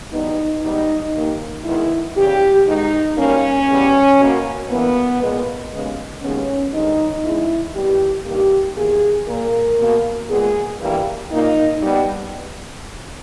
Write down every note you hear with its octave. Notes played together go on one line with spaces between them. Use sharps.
E2 B2 G3 B3 D#4
G#2 G3 B3 D#4
D#2 D#3 A#3
G#2 D#3 G#3 B3 E4
E2 C#3 G3 G4
G#2 D#3 G#3 D#4
B2 G3 A#3 C#4
E2 C#3 G3 B3
B2 A#3
G2 E3 A#3 B3
A#2 G#3 B3
D#2 C#3 G#3 B3
D#2 C#3 G#3 B3 C#4
G2 D#3 G#3 D#4
E2 C#3 G#3 B3 E4
D#2 D#3 G3 B3 G4
G2 D#3 A#3 G4
E2 D#3 A#3 G#4
A#2 A#3 A#4
B2 A#3
A#2 G#3 B3 G#4
G2 E3 G3 A#3
A#2 A#3 D#4
G2 G3 B3